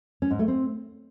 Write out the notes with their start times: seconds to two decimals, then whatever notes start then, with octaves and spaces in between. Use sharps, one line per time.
0.22 C#4
0.31 G#2
0.39 A3
0.48 C4